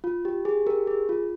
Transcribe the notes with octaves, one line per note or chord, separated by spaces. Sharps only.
F4
G4
G#4
G4 A#4
G#4
F4